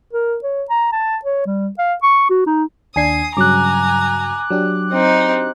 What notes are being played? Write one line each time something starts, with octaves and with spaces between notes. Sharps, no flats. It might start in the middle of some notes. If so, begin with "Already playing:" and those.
A#4
C#5
A#5
A5
C#5
G3
F5
C#6
F#4
D#4
D#2 D4 G#5 D#6 G#6 C7
G2 C#3 F#3 G#5 A#5 D6 F#6
F#3 D4 G4
C4 D#4